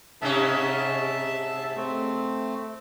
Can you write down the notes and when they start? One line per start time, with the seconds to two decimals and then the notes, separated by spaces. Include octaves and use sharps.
0.22 G#2 C3 C#4 E5 A5
1.76 A3 C4